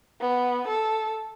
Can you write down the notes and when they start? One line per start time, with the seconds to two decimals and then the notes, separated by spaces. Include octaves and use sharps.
0.21 B3
0.68 A4